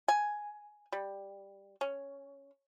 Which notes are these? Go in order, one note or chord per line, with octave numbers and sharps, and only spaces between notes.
G#5
G3
C#4